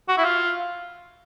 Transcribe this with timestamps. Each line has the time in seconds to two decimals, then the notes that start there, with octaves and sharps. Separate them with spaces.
0.08 F#4
0.18 E4
0.24 F4